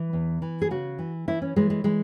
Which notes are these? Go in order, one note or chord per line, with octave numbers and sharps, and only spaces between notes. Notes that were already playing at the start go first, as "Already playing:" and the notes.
Already playing: E3
E2
E3
G#4
C#3 F#4
E3
E3 E4
C#4
E3 G#3
G#3
E3 G#3